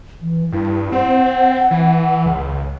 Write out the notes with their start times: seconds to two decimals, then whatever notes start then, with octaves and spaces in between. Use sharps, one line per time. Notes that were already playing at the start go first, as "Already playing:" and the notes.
0.22 E3
0.52 G2 E4
0.92 C4 F#5
1.71 E3
2.26 C#2